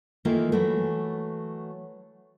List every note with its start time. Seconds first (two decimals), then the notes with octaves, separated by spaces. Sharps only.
0.25 D#3 E3 A3 A#3 F4
0.52 E3 F#3 A3